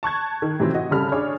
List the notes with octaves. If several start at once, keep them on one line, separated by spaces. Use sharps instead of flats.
A5 C#6 F#6 G#6
D#3
A2 C3 D#3 E3 F#3 C4
F#4 D#5
C#3 G3 A4 B5 F6
D4 G#4 C#5